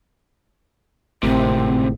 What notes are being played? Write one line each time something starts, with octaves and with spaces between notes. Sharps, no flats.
G#1 D2 A2 C3 C4 G4 A#4